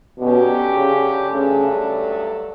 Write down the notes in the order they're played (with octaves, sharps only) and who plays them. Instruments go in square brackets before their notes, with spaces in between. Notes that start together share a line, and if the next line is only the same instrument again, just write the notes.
[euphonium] B2 [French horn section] D3 F#3 C#4 G4
[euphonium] C#3
[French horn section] G2 F#3 A3 D4 A4 [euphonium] C#3